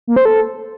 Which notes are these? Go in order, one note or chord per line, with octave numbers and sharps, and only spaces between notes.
A#3
C5
A4